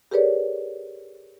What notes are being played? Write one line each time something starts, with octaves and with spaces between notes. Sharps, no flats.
G4 G#4 A#4 B4 C#5 D5